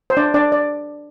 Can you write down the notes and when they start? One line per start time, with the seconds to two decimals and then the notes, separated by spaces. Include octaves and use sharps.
0.10 C5
0.17 D4 D5
0.34 D4 D5
0.52 D5